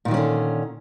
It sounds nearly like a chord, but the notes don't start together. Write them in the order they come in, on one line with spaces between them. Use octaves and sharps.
A#2 D#3 F#3 C#4 D3